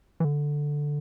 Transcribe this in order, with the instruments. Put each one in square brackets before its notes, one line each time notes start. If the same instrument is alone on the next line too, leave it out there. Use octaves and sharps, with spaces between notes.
[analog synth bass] E3
D3